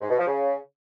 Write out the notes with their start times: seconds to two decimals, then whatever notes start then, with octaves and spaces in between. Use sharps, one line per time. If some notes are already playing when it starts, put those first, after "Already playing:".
0.01 G#2
0.10 B2
0.18 F3
0.27 C#3